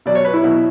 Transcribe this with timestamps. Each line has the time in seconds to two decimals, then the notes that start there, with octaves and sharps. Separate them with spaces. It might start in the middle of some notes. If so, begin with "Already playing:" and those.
0.06 B2 F#3 D5
0.15 C#5
0.25 B4
0.34 E4
0.44 B2 F#3